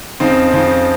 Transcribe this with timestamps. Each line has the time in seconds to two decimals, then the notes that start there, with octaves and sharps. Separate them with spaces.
0.20 F2 C#3 F3 C4 D#4
0.52 F2 C#3 F3 C4 D#4